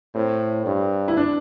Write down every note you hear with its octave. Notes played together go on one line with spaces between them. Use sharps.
A2 C4
G2
E4
D4